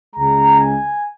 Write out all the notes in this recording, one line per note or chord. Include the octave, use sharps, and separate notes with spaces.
C#2 C#3 G#3 A#5
G#5